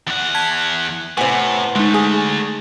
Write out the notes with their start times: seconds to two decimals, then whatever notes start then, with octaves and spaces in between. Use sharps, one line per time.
0.07 E2 F#5
0.35 A5 G#6 B6
1.17 A2 C3 B3 C5 G#5
1.75 D2 G#3 A3 D#4
1.94 G#4